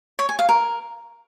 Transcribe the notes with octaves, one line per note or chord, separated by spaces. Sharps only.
C#5
G#5
F5
A#4